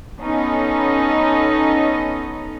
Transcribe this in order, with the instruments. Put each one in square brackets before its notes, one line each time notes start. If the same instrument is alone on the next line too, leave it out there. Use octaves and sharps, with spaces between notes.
[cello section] B3 C#4 D#4 A4 D#5